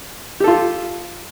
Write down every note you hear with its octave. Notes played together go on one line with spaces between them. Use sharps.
F4 G4 A4